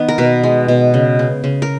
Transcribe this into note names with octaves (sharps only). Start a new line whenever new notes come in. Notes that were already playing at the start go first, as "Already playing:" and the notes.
Already playing: D#3 B3
A#4
B2 B4
G#3
B2
C#3
C#3
C#3
A#4